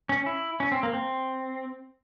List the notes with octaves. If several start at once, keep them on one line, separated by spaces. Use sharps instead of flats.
C#4
E4
C#4
C4
A#3
C4